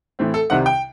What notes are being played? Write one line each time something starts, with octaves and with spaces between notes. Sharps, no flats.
A2 E3 A3 C4
A4
C2 C3 D#3 G3 C4 F#5
G5